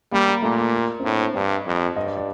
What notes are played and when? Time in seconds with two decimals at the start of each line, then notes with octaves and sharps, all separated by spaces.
0.12 G3 A#3
0.28 A#3
0.42 A#2 A3
0.58 A#3
1.00 C4
1.04 A2 D4
1.20 C5
1.34 G2 D5
1.51 D#5
1.66 F2
1.96 G2 D#5
2.07 D5
2.17 D5